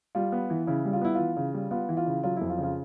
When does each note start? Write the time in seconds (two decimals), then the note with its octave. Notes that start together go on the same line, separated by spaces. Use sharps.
0.15 G3 F4
0.32 B3
0.50 E3
0.67 C#3 E4
0.85 G3
0.93 F4
1.01 B3 E4
1.15 E3 F4
1.37 C#3
1.54 G3
1.71 B3 F4
1.89 E3
1.97 F4
2.06 C#3
2.23 F#3 F4
2.37 F2 E4
2.50 F4
2.58 C#3
2.63 F4